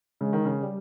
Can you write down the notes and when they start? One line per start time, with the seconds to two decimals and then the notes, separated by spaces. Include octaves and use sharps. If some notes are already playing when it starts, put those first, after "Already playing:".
0.20 C#3 G#3
0.33 D#3
0.45 C#3
0.62 G3